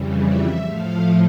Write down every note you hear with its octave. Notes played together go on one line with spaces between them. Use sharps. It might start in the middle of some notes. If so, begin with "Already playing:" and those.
Already playing: F2 C#3 E3 G3
E5
A2 F3 A3 F5